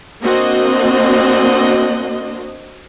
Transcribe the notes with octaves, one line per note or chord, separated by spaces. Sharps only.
A#3 C4 D4 F#4 D#5